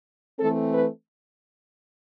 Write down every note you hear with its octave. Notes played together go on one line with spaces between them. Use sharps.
E3 A3 C4 A4
B4